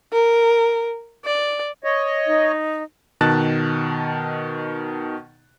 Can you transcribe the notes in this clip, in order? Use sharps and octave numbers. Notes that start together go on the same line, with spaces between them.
A#4
D5
C#5 D#5
D#4
B2 D#3 A5 F#6 A6